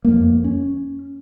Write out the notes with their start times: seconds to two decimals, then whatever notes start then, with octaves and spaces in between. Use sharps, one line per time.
0.05 F2 A#3
0.44 C#4